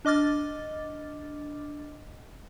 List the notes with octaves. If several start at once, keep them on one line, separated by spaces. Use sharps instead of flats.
D4 D#5 D6 F6 A6